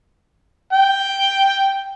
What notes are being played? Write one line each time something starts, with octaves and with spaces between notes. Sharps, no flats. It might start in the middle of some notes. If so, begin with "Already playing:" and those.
G5